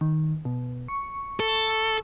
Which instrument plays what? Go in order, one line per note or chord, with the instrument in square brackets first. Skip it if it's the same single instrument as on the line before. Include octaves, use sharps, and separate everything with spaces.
[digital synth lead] D#3
B2
C#6
[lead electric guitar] A4